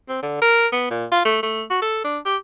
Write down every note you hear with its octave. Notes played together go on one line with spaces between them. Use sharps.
C4
D3
A#4
B3
A#2
F4
A3
A3
F#4
A4
D4
G4